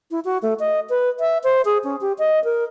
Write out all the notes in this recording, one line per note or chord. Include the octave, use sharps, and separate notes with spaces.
E4
F#4
A3
D#5
B4
E5
C5
G#4
C#4
G4
D#5
A#4